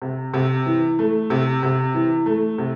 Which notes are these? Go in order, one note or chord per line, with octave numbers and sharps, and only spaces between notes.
C3
C3
E3
A3
C3
C3
E3
A3
C3